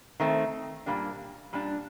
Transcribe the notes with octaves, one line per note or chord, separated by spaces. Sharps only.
D#3 A3 C4
A#2 G3 A#3 D4 G4
A#2 G3 D4